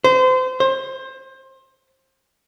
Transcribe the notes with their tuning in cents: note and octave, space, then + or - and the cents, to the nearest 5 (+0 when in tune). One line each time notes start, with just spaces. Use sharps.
C5 -30
C5 +25